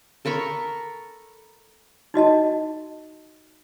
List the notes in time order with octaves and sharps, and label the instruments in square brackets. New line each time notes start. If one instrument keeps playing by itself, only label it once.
[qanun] A4 A#4 B5 C#6
[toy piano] D#4 F#4 D#5 A5